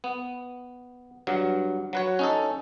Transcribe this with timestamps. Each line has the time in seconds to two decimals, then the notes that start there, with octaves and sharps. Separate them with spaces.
0.04 B3
1.27 G2 F#3
1.93 F#3 B4 C#5
2.19 C#4 D#4 A4